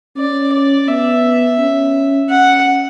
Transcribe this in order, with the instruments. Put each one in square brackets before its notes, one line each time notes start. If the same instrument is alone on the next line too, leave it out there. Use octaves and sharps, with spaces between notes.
[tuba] C#4 [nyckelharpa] D5
[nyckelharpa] D5
[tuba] B3 [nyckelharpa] E5
[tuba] C#4
[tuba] C#4 [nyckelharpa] F#5